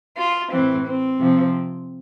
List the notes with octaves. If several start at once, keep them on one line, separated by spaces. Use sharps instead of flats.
F4
E3 C4
A2
C4
C3 F3